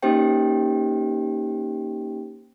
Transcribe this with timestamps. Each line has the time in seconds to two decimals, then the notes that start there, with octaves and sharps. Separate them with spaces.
0.02 A#3 C#4 D#4 G4 C5 G5